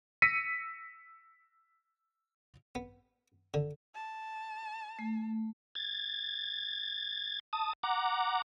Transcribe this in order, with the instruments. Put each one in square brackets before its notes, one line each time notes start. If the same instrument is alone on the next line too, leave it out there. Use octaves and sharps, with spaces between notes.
[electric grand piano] E6 A#6 B6 C#7 D#7
[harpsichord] B3
D3
[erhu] A5
[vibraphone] A3
[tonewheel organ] G#6 A6
A5 D#6
F#5 A#5 D6